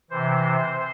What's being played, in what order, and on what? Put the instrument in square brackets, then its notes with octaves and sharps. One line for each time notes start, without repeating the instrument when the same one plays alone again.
[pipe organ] C3 E3 C5